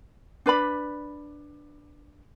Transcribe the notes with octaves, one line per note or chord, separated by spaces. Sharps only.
D4 B4 D5 B5